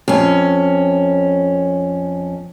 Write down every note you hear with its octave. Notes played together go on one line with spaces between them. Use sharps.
F2 C#4